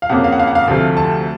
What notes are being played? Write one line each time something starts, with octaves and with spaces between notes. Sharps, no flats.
F5
F2 C#3 F3 A#3 F#5
F5
F#5
F5
F#5
F5
D2 C3 F3 A3
A5